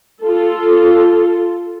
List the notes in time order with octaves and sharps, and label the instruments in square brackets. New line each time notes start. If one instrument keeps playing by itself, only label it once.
[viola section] F4 A4